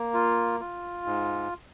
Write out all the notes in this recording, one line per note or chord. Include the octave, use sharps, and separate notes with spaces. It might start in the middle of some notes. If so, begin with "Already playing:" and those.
Already playing: A#3
F4
F4
G#2